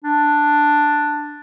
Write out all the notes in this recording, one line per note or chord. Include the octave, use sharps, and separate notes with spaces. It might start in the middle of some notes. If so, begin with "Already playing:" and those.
D4